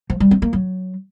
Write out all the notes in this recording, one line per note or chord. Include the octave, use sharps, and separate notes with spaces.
F3
G3
C4
A#3
F#3